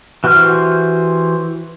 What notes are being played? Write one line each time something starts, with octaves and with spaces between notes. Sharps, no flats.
E3 F#4 G4 C5 F6